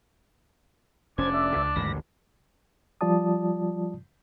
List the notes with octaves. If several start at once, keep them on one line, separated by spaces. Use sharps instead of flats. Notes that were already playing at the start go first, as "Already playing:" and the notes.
F1 C#4 D4 C5 G#6
D5 E5
C#2
A1 D#2 G#2 D3 B5 A#6
F3 G3 F4 D5 A5 D#6